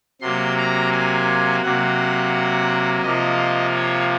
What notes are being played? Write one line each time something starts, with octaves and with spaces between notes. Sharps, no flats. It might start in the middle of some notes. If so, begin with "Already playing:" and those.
C3 F#3 A#3 C6
A#5
G#5
C3 F#3 A#3 F#5
C3 F3 A#3 D#5
C#5